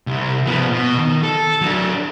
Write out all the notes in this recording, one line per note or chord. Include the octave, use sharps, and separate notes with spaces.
C2
F3 B3
B2
D#3
A4
F#3 D4